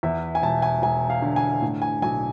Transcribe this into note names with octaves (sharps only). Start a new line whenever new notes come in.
E2 E5
G#5
E1 A5
G#5
E1 G#5
F5
D3
G#5
A2
G#5
B1 G#5